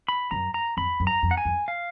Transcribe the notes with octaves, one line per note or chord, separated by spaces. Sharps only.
B5
F#2 A#5
A#5
F2 B5
F#2
A#5
F2
F#5
G#5
F2
F5